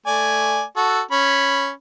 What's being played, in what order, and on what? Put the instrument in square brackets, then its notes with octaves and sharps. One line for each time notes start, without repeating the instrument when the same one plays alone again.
[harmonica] A3 D5 G#5
F#4 A4
C#4 B5